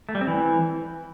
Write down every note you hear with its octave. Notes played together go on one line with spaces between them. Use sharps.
A3
G3
C4
E3